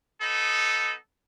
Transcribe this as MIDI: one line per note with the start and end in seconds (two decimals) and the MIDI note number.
0.21 0.93 59
0.21 0.93 63
0.21 0.93 69